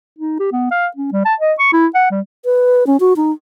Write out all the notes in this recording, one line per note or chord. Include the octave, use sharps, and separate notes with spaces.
D#4
G4
B3
F5
C#4
G3
A5
D#5
C#6
E4
F#5
G3
B4
C#4
F#4
D#4